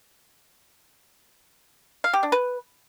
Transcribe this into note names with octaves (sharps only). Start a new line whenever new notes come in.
F5
G4
D4
B4